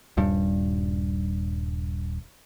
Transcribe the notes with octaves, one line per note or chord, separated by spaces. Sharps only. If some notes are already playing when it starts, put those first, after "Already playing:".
D#1 G2